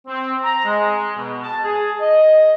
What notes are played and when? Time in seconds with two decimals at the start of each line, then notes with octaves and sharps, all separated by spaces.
0.08 C4
0.44 A#5
0.65 G#3
1.17 B2
1.42 A5
1.63 G#4
2.01 D#5